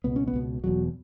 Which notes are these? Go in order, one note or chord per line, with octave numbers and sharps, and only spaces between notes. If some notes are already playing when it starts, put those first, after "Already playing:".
C#2 B2 B3
C#4
B3
C#2 B2
E1 E2 B2 F#3